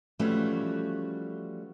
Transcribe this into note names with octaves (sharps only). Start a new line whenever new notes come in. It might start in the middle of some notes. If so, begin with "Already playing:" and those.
E3 F3 G3 A3 C#4 F#4